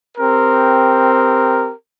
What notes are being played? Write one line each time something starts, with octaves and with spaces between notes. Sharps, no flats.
C4 G4 A#4